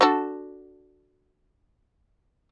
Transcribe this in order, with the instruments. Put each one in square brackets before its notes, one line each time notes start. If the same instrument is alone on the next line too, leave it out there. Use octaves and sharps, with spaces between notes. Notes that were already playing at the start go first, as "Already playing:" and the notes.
[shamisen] D4 F#4 A4